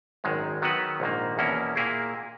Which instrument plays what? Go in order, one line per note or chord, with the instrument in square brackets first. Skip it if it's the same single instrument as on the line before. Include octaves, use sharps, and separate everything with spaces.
[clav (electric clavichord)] G#1 F#2 D#3 G#3
D#3 F#3 B3 F#4 B4
A#1 G#2 D#3 A#3
E2 B2 A#3 C#4 E4
A#2 A#3 E4 G#4